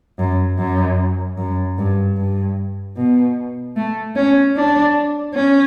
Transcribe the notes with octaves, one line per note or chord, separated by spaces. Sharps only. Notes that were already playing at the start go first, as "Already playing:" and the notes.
F#2
F#2
F#2
G2
G2
B2
A3
C#4
D4
C#4